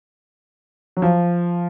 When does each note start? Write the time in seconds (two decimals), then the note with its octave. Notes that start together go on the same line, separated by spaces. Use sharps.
0.97 F#3
1.02 F3